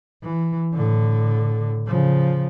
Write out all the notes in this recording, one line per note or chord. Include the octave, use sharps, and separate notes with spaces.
E3
A2 D3
C#3 F3